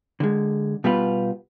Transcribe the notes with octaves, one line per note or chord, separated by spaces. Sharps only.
D3 G#3
B2 G3 B3 F4 B4